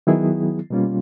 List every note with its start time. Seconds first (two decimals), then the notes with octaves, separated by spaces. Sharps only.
0.07 D#3 F#3 B3 E4 G#4
0.70 B2 G3 A#3 C#4 F4